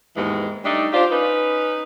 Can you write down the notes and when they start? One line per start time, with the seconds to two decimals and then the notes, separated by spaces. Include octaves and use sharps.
0.16 D#2 G#2 E3 G#3 B3
0.65 G3 A3 D4 D#4
0.93 D4 F4 G4 C5 D5
1.11 C#4 D#4 B4